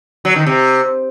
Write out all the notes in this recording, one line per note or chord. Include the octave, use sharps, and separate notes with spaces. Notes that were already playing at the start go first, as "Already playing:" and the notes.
F#3
D#3
C3